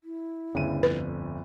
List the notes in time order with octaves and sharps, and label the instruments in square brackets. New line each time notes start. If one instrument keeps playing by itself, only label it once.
[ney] E4
[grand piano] G1 D2 D#7 [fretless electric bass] C#3
[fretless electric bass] F2 [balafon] B4